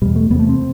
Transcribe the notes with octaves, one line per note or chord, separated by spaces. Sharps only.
E2 B2 G3
A3
E2 C3 B3
A3
C4